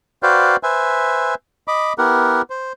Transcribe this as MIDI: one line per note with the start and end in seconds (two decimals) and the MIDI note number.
0.23 0.56 66
0.23 0.56 71
0.23 0.56 72
0.23 0.56 74
0.23 0.56 77
0.23 0.56 79
0.63 1.35 71
0.63 1.35 72
0.63 1.35 76
0.63 1.35 80
1.68 1.93 75
1.68 1.93 83
1.68 1.93 86
1.98 2.42 59
1.98 2.42 64
1.98 2.42 67
1.98 2.42 70
1.98 2.42 78
2.50 2.73 72